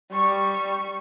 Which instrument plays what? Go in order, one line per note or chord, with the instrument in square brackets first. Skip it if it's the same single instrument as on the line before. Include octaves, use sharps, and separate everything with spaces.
[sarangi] G3 [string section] C#6